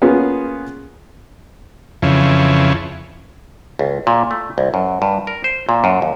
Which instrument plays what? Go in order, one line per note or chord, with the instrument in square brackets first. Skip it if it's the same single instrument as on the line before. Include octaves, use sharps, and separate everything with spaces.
[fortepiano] A#3 B3 C#4 F4 G#4
[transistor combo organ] F2 C#3 E3
[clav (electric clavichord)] C#2
A#2
A3
C2
F#2
G2
A#4
C5
A#2
F#2
D#2